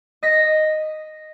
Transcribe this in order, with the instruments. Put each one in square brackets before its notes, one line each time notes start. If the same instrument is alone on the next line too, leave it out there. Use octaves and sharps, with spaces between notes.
[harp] D#5 A#6 B6